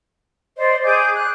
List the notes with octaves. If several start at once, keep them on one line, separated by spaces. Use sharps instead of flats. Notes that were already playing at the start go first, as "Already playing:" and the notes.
C5 D5 D#5
G#4 D6 G6
F#6